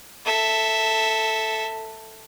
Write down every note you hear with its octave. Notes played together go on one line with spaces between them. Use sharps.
A4 E5